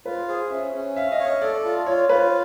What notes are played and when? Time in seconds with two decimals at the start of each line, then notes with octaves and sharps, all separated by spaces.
0.06 F4 B4
0.28 G#4 C5
0.51 C#4 E5
0.73 C#4
0.96 E5 F5
1.12 D#5
1.19 C#5
1.26 D#5
1.41 A4 D5
1.64 F4
1.86 F4 C#5
2.09 F4 B4